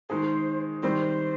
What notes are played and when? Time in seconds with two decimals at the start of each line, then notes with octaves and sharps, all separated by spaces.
0.10 D#3 G#3 D#4 G#4 C5
0.83 D#3 G3 C4 C5